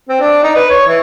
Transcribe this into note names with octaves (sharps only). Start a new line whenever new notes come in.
C4
D4
D#4
B4
C#5
E3